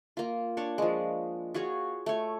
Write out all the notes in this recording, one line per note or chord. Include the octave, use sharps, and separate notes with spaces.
A#3 F4
D4 C#5
F3 G#3
F4 F#4 G#4 C#5
A3 C#5